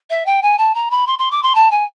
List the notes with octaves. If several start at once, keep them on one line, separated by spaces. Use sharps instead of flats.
E5
G5
G#5
A5
A#5
B5
C6
C6
D6
C6
A5
G#5